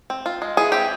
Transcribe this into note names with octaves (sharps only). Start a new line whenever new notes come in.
C4
F4
G#3
E3 G#4
C4 G4